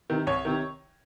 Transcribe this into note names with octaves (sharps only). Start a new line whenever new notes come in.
C3 D#3
C2 C#5
C3 D#3